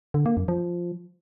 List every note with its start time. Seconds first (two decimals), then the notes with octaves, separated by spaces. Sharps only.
0.14 D3
0.26 A#3
0.37 F#2
0.48 F3